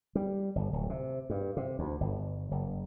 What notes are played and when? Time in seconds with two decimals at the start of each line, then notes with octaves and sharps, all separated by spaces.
0.15 G3
0.55 G1
0.73 D1
0.90 C3
1.30 G2
1.57 C3
1.79 D2
2.00 G1
2.51 F#1